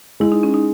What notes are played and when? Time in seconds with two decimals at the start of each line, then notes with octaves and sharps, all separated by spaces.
0.20 G#3 E4
0.32 D#4
0.43 C#4
0.54 D#4